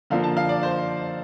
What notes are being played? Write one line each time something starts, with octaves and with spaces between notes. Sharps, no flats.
D3 F3 A#3 F5
A5
F5
D5
C5